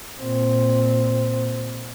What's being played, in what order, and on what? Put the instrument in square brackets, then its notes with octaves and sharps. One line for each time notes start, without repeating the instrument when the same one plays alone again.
[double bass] A#2 C4